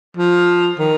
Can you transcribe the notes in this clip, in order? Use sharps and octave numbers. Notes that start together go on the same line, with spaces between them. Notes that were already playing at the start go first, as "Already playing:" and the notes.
F3
D#3